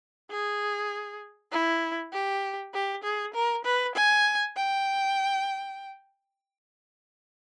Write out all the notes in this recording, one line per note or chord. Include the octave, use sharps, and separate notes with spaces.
G#4
E4
G4
G4
G#4
A#4
B4
G#5
G5